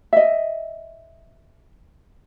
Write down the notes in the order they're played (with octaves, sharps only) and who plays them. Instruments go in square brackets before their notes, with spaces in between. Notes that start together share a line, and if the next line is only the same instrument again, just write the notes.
[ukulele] D#5 E5